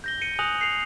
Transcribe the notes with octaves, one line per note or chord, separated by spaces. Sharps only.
G6 A#6 G7
C#7 D#7
G#5 D#6 F#6 A#6 F7 F#7
C7 F7